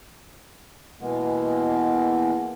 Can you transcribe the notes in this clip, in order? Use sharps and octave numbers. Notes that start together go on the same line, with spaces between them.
B2 E3 G#3 A#3 B3